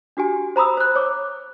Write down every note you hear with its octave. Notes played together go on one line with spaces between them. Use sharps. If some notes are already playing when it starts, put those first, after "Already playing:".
D4 F#4 G4 G#5
C5 A#5 B5 D#6 E6
C5 F#6
C#5 D6